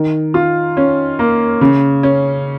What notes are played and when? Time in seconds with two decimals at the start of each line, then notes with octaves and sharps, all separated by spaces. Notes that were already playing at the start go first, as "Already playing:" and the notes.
Already playing: D#3
0.34 F4
0.77 C#4
1.19 A#3
1.61 C#3
2.03 C#4